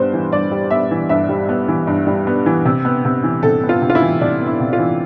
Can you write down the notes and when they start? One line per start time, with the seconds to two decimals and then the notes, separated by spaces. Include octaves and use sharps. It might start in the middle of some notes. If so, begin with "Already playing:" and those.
Already playing: G2 G3 B3 C5
0.13 E3
0.32 G2 D5
0.51 G3
0.71 B3 E5
0.91 E3
1.09 G2 E5
1.29 G3
1.49 B3
1.68 E3
1.87 G2
2.07 G3
2.27 B3
2.46 E3
2.65 C3
2.85 B3
3.05 C3
3.24 E3
3.43 C3 A4
3.63 B3
3.69 F4
3.82 C3
3.90 F4
3.95 E4
4.02 E3
4.21 C3 D4
4.40 B3
4.47 E4
4.60 C3
4.73 F4
4.79 E3